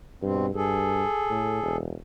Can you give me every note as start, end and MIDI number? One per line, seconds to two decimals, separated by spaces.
0.22 0.50 43
0.22 0.46 47
0.22 0.46 60
0.54 1.04 43
0.54 1.77 68
0.54 1.77 69
1.30 1.59 45
1.63 1.94 28